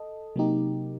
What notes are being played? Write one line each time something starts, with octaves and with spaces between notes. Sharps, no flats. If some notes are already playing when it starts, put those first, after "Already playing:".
Already playing: A4 D#5
C3 F#3 A#3 D#4 G4